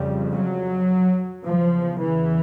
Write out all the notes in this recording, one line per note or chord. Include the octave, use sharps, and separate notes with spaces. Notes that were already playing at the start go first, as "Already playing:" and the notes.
Already playing: F2 C#3 G3
F#3
E2 C#3 F3
E3